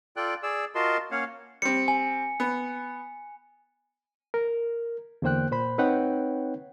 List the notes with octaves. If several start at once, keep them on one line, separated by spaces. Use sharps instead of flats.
F4 A4 D5 G5 F#6
G#4 D5 E6
F4 F#4 A#4 D#5 A5 C6
A#3 C#4 C#5 F5 F#5
G3 C4 C#7
G#5
B3
A#4
E2 D3 A#3 C5 G5 F#6
A#2 C5 B5
C4 D#4 B4 C#5 F#5 G5